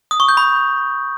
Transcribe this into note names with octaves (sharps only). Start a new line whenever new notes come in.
D#6
C#6
G6
B5